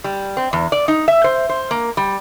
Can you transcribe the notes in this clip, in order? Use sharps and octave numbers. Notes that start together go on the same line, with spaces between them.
G3
C4
E2
D5
D#4
E5
C5
C5
A#3
G3